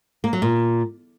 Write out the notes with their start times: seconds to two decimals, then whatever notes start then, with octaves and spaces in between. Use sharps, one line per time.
0.24 A#3
0.33 F#3
0.42 A#2